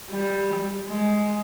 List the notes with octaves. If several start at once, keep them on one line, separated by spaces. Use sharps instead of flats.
G3
G#3